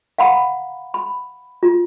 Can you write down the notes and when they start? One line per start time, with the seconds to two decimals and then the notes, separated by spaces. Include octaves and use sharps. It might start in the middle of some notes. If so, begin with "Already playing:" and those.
0.19 F5 F#5 A#5 B5
0.94 B5
1.63 F4